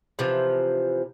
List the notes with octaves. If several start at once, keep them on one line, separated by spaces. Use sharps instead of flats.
C3 E3 F3